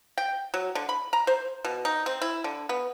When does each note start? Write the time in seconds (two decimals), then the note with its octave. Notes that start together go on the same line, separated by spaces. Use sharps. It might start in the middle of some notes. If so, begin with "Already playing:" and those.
0.18 G5
0.54 F#3
0.75 D3
0.89 B5
1.13 A#5
1.27 C5
1.65 B2
1.85 D#4
2.06 C4
2.22 E4
2.44 D3
2.69 B3